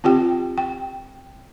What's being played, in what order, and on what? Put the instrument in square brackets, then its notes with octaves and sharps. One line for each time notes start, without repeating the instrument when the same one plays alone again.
[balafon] C4 F4 G4 G5
G5